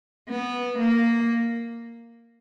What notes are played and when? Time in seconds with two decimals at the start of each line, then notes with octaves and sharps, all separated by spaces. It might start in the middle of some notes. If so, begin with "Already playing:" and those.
0.29 B3
0.79 A#3